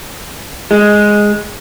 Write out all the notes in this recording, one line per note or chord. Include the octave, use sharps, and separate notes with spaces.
G#3